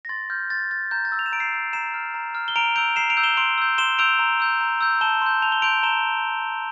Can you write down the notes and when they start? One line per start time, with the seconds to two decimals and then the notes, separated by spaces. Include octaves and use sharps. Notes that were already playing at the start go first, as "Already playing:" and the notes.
0.05 A#6
0.09 C6 A6
0.30 F6 G6
0.50 C6 A6
0.71 F6 A6
0.91 A#5 G6
1.05 A6
1.12 E6 G6
1.19 F7
1.26 E7
1.32 A#5 D7
1.40 C7 E7
1.53 E6 G6
1.73 A#5 C7 E7
1.94 F6
2.14 A#5
2.35 F6
2.48 G7
2.56 A#5 D7 F7
2.76 E6 G6 D7 F7
2.96 A#5 C7 E7
3.10 D7 F7
3.17 E6 G6
3.23 E7 G7
3.37 C6 D7 F7
3.58 E6 G6
3.78 C6 E7 G7
3.99 E6 G6 D7 F7
4.19 A#5
4.40 E6 G6
4.61 A#5
4.81 E6 G6
5.01 A5 E7 G7
5.22 C6 G6
5.42 A5 F7
5.52 G7
5.62 C6 G6 D7 F7
5.83 A#5 E7 G7